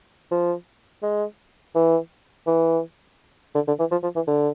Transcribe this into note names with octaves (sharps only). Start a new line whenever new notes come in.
F3
G#3
E3
E3
D3
D3
E3
F3
F3
E3
D3